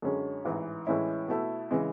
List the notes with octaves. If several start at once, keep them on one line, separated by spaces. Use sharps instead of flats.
F#2 D3 G#3 C#4 G#4
A1 G#2 E3
A2 E3 G#3 C#4 E4
B2 A3 E4
C#3 E3 G#3